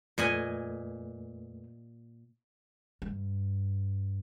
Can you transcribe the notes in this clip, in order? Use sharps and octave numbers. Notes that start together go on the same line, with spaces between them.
F2 A#2 A3 B4 D#5 G#5
G2